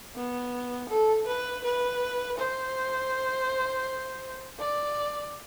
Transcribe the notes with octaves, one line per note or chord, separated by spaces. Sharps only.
B3
A4
B4
B4
C5
D5